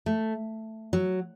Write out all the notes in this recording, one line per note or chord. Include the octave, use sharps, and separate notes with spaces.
A3
F#3